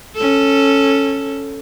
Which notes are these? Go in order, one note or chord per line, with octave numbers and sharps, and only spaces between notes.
C#4 A4